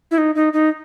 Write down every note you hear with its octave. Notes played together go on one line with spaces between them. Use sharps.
E4
D#4
D#4
D#4